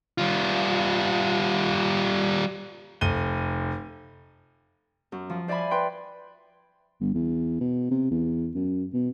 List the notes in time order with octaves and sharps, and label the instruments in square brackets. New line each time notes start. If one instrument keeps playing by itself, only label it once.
[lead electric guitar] G3 F4
[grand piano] F1 D#7 G7
[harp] F#2
F3
C5 D5 E5 G#5 B5
B4 G5 C6
[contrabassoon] G1
E2
B2
C3
E2
F#2
B2